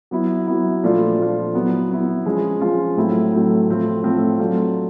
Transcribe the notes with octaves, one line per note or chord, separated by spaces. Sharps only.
F#3 B3 E4
F#3 B3 E4
A#2 F3 A3 D4 F4
A#2 F3 A3 D4 F4
F#3 B3 E4
F#3 B3 E4
F3 G#3 C#4 F4
F3 G#3 C#4 F4
A2 F#3 A3 C4 E4
A2 F#3 A3 C4 E4
A2 F3 A3 C4 F4
A2 F3 A3 C4 F4
F#3 A3 D4 F4